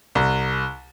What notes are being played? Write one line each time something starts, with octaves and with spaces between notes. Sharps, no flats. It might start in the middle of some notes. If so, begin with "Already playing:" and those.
C2